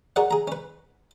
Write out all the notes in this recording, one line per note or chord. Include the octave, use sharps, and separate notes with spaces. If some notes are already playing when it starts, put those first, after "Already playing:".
F#4 G#4 A#4 C#5 D5 F#5
G#4 A#5
C#4 B4